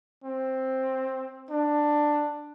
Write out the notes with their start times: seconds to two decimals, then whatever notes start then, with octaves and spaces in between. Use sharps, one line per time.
0.24 C4
1.50 D4